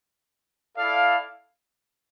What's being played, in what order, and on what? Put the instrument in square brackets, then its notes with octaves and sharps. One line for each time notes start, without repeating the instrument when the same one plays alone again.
[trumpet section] E4 A4 D5 F5